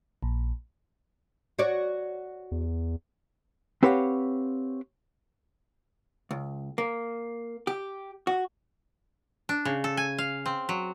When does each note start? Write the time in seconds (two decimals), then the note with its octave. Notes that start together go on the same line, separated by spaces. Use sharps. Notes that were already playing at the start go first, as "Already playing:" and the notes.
0.23 A#1
1.59 F#4 C#5 D5
2.52 E2
3.83 C4 G4 B4 C#5 F5 F#5
6.31 C#2
6.78 A#3
7.67 G4
8.27 F#4
9.49 D4
9.65 C#3
9.84 A4
9.97 G#5
10.18 F5
10.46 C4
10.69 F#3